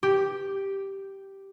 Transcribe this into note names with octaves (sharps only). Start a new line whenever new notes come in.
G4